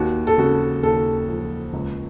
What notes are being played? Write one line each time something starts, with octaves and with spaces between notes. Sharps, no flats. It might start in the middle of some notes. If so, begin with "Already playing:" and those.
Already playing: D#2 F#4
A4
C#3 F#4
D#2 A4
F3
C#2